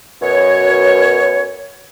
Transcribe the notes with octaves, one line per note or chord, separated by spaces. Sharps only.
F#2 B2 C#5